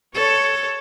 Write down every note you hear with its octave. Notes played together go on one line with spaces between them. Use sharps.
A4 C#5